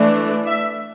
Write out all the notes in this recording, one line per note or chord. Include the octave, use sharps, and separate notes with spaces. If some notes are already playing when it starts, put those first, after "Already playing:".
Already playing: E3 A3 D4
E5